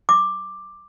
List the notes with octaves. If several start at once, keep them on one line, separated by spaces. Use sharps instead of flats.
D6